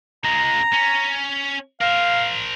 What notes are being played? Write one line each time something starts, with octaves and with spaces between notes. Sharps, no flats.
C#2 G#3 A#5
C#4
A#4 C5 F5